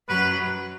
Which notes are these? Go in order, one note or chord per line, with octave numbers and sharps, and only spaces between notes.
F#2 F#3 B4